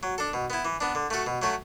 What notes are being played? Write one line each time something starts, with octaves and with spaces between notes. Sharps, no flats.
F#3
D4 A4
B2
B3 E4
E3
B3 D4
D3
A3 F#4 A4
B2
F#3 A3 F#4